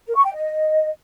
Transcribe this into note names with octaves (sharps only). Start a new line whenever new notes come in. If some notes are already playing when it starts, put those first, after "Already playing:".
A#4
C#6
G5
D#5